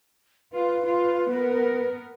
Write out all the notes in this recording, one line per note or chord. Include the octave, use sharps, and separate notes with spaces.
F4 B4
F4
B3 A#4